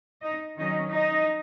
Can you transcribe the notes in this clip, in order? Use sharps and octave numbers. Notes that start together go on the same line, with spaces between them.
D#4 D#5
D#3 F#3 C#4 D#4 D#5
D#4 D#5